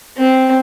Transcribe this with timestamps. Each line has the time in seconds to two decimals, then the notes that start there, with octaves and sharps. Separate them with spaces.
0.17 C4